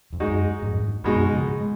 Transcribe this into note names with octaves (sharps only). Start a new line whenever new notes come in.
F2
F#2 G#3 D#4 F#4
F2 G#2
F#2 B2 G#3 D#4 F#4
C#3 F3
G#3